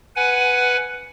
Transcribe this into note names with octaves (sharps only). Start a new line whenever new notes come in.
B4 F#5 G#5